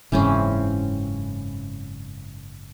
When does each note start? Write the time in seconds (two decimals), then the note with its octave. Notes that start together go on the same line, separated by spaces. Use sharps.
0.12 F#1 G#2 C#3 E3 C4 C#4